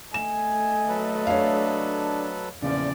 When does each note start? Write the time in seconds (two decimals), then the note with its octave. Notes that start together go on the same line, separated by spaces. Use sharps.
0.14 A3 D#5 G#5 E7
0.89 F#3 A4 B4
1.27 D4 C#5 F5
2.62 E2 A#2 C#3 F3 D5